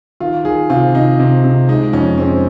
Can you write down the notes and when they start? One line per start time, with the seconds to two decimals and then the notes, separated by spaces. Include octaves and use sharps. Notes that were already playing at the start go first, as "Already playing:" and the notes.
0.20 D#3 F4
0.45 D#3 G#4
0.70 C3 F4
0.95 C3 D#4
1.20 C3
1.44 C3
1.69 G#3 D#4
1.93 F2 C#4
2.18 G#3 C4